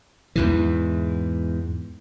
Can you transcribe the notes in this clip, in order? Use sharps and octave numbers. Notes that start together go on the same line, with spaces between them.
E2 G#2 E3